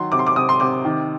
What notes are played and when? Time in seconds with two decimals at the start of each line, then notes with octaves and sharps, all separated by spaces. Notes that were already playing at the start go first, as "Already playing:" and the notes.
Already playing: D#3 F#3 C6
0.12 C3 D6
0.19 C6
0.27 D6
0.36 C3 D#6
0.49 C6
0.60 C3 D6
0.85 D#3